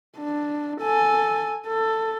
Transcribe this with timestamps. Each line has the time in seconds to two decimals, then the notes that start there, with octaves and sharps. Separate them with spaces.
0.17 D4
0.81 A4 G#5
1.67 A4